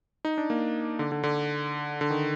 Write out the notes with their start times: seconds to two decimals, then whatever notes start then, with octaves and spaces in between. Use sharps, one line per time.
0.25 D#4
0.38 D4
0.50 A#3
0.99 D3
1.12 D3
1.23 D3
2.01 D3
2.10 D#3